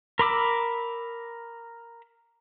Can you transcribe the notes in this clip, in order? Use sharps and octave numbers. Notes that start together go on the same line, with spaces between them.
A#4 B5 D6 E6